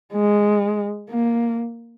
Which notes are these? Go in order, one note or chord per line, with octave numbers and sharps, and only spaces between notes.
G#3
A#3